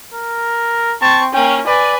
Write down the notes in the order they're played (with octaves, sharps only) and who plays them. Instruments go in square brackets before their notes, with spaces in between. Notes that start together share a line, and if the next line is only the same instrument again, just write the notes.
[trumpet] A#4
[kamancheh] C4 C#6 [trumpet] A5
[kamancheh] A#3 C#4 [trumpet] G5
[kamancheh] B4 G#5 [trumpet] D5